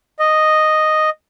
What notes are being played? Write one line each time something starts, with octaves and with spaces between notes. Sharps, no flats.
D#5